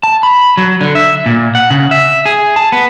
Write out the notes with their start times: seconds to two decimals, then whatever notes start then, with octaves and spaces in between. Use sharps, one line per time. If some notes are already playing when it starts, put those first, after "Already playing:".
0.03 A5
0.23 B5
0.57 F#3
0.81 D3
0.95 E5
1.26 A#2
1.55 F#5
1.70 C#3
1.91 E5
2.26 G#4
2.56 A5
2.72 B3